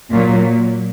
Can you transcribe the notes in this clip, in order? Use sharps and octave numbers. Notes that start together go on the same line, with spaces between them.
A#2 F#3